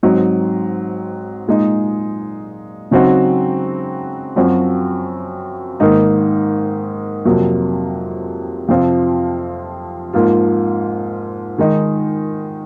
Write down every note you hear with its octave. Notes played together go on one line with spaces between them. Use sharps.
G#2 F#3 C4 D#4
A#2 G#3 D#4
C#3 F#3 C4 D#4 F#4
F#2 F3 C4 F#4
G#2 D#3 A#3 D#4
F2 C3 F#3 A#3
F2 C3 F3 C4 F4
G#2 F3 A#3 F4
D#3 G#3 D#4